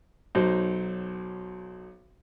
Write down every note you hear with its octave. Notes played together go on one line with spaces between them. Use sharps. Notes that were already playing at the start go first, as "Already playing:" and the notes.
B1 F#3 D#4 C5